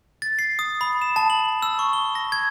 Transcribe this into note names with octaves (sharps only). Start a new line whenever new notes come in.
A6
C7
D#6
B5
E7
A5
F#7
E6
C#6
G7
A#6
G#6